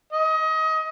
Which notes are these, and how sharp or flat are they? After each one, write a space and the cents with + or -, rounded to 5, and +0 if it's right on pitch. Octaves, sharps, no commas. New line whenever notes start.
D#5 +25